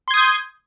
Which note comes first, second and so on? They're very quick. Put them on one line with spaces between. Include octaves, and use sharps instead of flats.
C6 G#6 D#6 G6